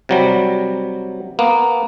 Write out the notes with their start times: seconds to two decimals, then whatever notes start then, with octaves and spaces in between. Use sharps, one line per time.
0.09 C3 F#3 G3
1.39 A#3 B3